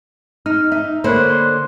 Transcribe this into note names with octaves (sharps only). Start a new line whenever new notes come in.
D#4 F6
D#4 E5
D3 A#3 C5 C#5 B5 F#6
C6